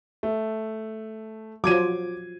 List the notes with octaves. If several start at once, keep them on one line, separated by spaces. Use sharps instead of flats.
A3
F3 F#3 D6 G#6 D#7